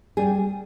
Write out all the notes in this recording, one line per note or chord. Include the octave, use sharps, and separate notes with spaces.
G3 G#4